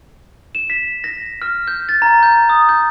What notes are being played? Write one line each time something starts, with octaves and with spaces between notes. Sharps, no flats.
E7
B6
A#6
F6
G6
A6
A#5
G6
D#6
G6